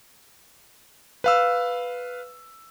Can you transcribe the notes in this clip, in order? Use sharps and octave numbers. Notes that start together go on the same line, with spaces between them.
B4 F5 E6